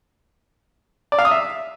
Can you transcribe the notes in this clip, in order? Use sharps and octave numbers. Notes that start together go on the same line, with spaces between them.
D5
F5
D#6
E5